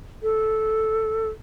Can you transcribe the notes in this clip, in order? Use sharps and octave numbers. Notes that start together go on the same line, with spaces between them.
A4